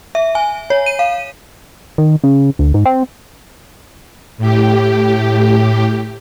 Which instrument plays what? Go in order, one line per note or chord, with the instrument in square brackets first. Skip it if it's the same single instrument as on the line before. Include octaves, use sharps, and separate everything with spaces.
[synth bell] E5
G#5
C#5
D#7
F5
[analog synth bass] D#3
C#3
D2
G#2
C4
[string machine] A2 G4